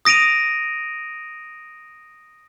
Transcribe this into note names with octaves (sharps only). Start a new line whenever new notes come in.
D#6 A#6 D7 D#7 F7